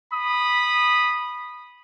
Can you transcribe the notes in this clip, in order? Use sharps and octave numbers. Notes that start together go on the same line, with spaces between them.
B5 D#6